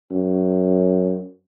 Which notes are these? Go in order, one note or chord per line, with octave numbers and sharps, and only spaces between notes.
F#2